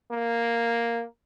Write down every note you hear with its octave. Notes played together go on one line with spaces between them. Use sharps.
A#3